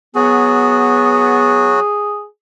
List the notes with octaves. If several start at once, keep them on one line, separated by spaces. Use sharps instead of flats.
F#3 B3 F#4 G#4